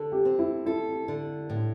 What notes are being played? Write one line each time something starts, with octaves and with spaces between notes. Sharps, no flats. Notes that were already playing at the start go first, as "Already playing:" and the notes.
Already playing: D3 A4
G4
C4
E4
E4 A4
D3
A2